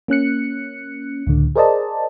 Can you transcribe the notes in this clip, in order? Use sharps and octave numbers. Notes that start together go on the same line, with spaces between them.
A#3 C#4 F#6 C#7
C#2 A2 D3
G#4 A#4 C5 D5 D#5 A5